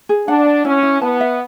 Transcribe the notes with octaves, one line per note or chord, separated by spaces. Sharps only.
G#4
D4 F#5
F#5
C#4 E4
E4
B3 A5
E5